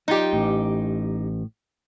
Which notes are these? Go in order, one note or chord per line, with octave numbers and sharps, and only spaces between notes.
F#3 D#4 F4 G4 G5
A1 A2